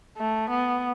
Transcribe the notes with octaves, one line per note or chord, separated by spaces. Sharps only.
A3
B3